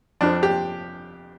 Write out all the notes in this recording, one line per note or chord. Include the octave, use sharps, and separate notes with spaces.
F2 F3 C4 D4
G4